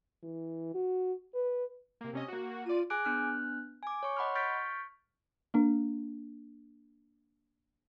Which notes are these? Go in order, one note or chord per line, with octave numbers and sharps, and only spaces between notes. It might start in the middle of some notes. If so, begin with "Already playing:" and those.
E3
F#4
B4
C3 A#3
C3 C#4 D#5
A#3 F#4
F4 D5 D#7
G#4 G#5 D6 F#6 D7
B3 D4 F6 F#6
G#5 D6
C#5 C#6
D#5 F#5 B5 C6 F6
C#6 F6 G6 A6 B6 D7
A#3 D4